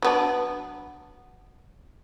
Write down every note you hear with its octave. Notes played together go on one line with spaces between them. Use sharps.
F#3 B3 D4